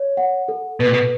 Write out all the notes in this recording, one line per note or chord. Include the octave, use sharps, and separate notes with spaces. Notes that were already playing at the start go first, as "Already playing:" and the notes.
Already playing: C#5
F#5
A4
B2 B4
A#2
B2